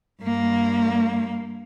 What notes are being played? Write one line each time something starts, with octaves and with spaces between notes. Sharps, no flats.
G2 A#3